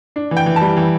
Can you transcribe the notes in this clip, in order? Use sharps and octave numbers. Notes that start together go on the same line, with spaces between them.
D4
E3
G5
E3
A5
G3
E3